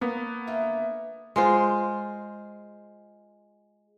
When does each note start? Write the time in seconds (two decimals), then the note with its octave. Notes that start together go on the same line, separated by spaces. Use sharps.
0.01 A#3 B3 C#5
0.47 D2 F4 E5
1.36 G#3 F4 C5